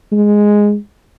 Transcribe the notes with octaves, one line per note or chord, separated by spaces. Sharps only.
G#3